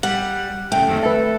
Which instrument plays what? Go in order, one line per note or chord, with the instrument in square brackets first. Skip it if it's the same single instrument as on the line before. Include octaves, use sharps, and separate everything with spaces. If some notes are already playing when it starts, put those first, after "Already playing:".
[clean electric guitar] G3 [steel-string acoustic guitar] F#5
[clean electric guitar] C#3 G5 [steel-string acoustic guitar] A3
[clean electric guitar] F#2 D#3 C4
[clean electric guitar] A4 [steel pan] B4 E5